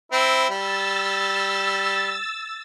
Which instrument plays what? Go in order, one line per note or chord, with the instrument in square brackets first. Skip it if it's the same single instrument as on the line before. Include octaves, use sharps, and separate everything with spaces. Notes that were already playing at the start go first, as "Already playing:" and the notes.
[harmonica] C4 E4
[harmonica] G3 [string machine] E6 A6